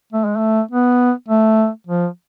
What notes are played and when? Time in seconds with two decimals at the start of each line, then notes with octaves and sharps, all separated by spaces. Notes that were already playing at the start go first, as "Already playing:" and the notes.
0.13 A3
0.25 G#3
0.37 A3
0.71 B3
1.28 A3
1.87 F3